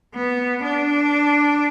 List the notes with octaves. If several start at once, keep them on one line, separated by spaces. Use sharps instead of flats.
B3
D4